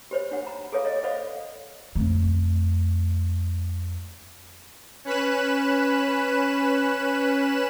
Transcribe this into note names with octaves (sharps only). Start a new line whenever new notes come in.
G4 C5 C#5
D4 F#5
A#5
G#4 A4 C#5 F5
A4 C#5 D#5
A4 C5 D5 D#5 F5 F#5
F2 A3
C#4 B4 B5 F#6 E7